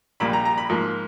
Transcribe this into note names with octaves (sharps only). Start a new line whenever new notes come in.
A#1 A#2 G3 B5
A#5
A#5
B5
G#2 F3 A#3